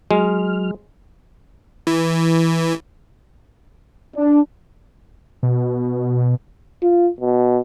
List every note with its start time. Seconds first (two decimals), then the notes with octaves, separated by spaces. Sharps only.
0.11 F#3 G#3 F6
1.87 E3
4.15 D4
5.43 B2
6.82 F4
7.20 B2